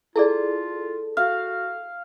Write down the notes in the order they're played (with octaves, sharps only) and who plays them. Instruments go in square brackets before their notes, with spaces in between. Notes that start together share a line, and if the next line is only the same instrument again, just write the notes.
[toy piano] E4 G#4 D5 [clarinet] F4 [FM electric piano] A4
[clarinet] F#4 [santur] F5